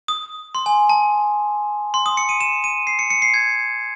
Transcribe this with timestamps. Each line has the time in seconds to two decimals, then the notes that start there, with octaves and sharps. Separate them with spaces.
0.08 D#6
0.55 C6
0.66 G#5
0.89 A5
1.94 C6
2.06 D#6
2.17 C#7
2.29 D#7
2.41 E7
2.64 D#7
2.87 C7
2.99 C#7
3.10 C#7
3.22 C7
3.34 G#6